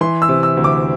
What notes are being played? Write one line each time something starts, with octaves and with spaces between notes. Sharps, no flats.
E3 C6
E6
C3
E6
D2
D6